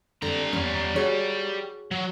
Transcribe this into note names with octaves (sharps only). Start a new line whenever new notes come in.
D3 G3 C4 A#5
E2 C#4
F#4 G#4 C#5
F#3